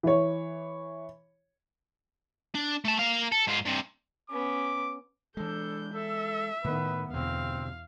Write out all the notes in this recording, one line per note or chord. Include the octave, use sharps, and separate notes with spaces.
E3 C#5
D4
A3 A5
A#3 F5
A4
G#2 F4
G2 C3
B3 C#4 D6
E3 G#3 D4 A4 G6
A4 E5
A2 D#3 B3 B4
E2 G2 B2 D3 C4 F5